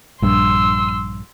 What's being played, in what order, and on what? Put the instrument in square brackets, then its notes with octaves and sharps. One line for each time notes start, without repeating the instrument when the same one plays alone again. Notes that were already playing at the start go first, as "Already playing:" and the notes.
[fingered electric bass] A#1 G2 [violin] C6 E6